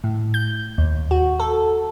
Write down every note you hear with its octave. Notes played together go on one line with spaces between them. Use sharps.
A2
G6
D#2
F#4
A4